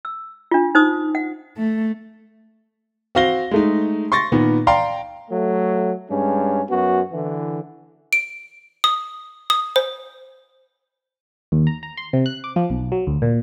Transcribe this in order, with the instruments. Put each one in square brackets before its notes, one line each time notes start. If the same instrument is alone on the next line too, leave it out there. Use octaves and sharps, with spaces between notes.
[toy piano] E6
D4 F4
D#4 C5 D#6
F#5
[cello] A3
[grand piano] C4 F#4 F5 A#6 G7
G#3 A3 D#4
C6 C#6 A6 A#6
A#2 D#3 B3
D5 F5 G5 A#5 C6
[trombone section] F#3 A3
G2 G#3 C#4
F#2 B3 F#4
D3 E3
[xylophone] D7
D#6
D#6
C5
[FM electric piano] D#2
A#5
A#5
C6
C3
F#6
D6
F3
B1
F#3
D2
A#2